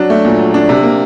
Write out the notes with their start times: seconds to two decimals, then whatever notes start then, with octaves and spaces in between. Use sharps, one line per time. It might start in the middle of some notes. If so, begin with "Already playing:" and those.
Already playing: F#3 D4
0.10 A3
0.25 A#2
0.38 F#3
0.54 D4
0.69 C3
0.83 A#3